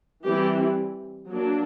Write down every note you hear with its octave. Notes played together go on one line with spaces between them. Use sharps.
E3 G3 C4 G4
F#3 A#3 D4